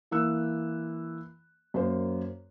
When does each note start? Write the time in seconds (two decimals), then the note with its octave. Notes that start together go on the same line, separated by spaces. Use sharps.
0.11 E3 A#3 E6 F#6
1.74 F#2 A#3 C5